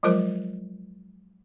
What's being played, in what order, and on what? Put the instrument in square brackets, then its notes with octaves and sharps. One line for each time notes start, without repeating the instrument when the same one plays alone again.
[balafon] F3 F#3 G#3 F4 A#4 C5